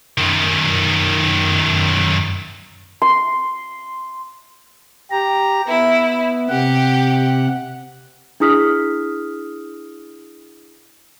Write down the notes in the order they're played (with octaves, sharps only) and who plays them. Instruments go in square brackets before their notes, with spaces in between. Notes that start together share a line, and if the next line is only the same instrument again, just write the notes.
[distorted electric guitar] F#2 D#3
[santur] C6
[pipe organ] G4 A#5
[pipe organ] B3 [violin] E4
[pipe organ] C3 F#5 [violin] G4
[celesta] D4 E4 G#4 D#6 F6 B6